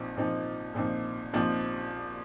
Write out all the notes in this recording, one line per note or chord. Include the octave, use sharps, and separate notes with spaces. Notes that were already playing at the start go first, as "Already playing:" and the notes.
Already playing: A#1 A#2 F3 C4 D#4
A#1 A#2 F3 C4 D#4
A#1 A#2 F3 C4 D#4
A#1 A#2 F3 C4 D#4